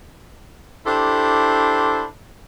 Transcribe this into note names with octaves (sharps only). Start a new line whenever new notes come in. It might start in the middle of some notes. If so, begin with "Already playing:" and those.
D4 E4 G4 A4 C5